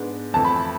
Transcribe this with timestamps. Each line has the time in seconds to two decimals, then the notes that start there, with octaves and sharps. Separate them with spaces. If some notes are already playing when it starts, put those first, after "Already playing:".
Already playing: G#2 G#3 B3 D4
0.34 F2 E3 A3 A5
0.45 B5